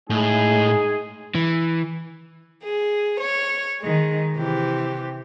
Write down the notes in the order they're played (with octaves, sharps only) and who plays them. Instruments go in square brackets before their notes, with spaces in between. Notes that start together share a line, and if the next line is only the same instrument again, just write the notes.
[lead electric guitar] A2 [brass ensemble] G#3 D#4 G#4
[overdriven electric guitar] E3
[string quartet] G#4
C#5
D#3 G#3
C3 E3 G4